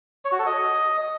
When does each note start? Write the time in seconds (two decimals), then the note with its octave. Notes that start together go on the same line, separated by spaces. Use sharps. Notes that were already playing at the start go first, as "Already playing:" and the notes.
0.25 C#5
0.32 F#4
0.39 A4
0.46 D#5